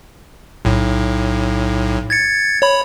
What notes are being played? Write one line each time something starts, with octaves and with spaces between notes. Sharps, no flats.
B1 A2
G#6 A6 C#7
C#5 B5